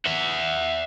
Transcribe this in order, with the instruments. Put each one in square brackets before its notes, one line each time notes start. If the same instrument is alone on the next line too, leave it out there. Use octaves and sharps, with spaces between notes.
[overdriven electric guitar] E5 F#5